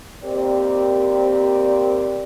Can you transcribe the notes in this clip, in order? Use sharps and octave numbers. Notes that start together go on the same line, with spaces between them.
D#2 C4 G4 A#4 D5